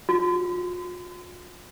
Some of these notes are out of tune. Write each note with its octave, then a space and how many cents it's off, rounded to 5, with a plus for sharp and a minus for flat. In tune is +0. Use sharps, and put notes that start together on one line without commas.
F4 +40